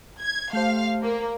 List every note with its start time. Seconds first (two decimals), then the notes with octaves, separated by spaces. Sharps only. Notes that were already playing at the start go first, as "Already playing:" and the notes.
0.21 G#6
0.53 A3 G4 C5 F5
1.03 A#3